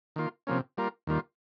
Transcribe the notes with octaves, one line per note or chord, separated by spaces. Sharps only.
D#3 A#3 F4
C3 F3 A#3 C#4
G3 A#3 F4 A#4
D#2 D#3 G3 A#3 F4